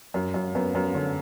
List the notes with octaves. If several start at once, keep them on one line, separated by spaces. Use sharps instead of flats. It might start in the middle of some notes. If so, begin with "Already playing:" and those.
F#2
F#2
F#2 B3
F#2
D3 C#4